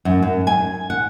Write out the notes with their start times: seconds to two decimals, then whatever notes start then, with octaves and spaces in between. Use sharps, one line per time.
0.05 F#2
0.23 F#2
0.47 G#5
0.90 F#5